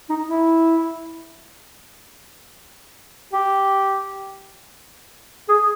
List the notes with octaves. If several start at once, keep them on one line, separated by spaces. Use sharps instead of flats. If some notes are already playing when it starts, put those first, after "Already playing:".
D#4
E4
G4
G#4